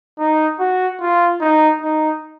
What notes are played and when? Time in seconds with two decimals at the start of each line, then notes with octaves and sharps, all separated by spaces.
0.18 D#4
0.59 F#4
1.00 F4
1.41 D#4
1.81 D#4